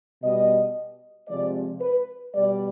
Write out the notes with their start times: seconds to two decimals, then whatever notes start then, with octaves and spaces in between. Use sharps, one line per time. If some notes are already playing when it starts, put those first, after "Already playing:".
0.22 B2 G3 D#5
1.28 C3 F3 G#3 D5
1.81 B4
2.34 B2 G3 D5